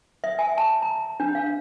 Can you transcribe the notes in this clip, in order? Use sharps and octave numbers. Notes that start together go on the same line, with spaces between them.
E5
G#5
A5
A#5
D4
F5